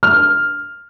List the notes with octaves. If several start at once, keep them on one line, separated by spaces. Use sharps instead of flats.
F6